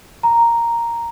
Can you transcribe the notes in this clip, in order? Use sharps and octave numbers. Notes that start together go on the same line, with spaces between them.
A#5